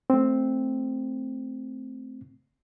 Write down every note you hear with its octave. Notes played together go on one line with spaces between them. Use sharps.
A3 C4